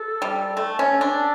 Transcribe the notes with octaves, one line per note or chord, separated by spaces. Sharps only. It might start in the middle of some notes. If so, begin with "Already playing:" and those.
Already playing: A4
G3
A3 A4
C#4
D4